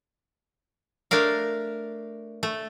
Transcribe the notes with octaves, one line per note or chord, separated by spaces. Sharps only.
A3 D4 A#4 F5
A3